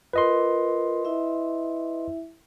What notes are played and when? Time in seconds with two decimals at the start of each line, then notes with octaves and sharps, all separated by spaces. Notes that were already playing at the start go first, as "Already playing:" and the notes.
0.13 F4 A#4 B4 D#5 C6
1.05 E4 E5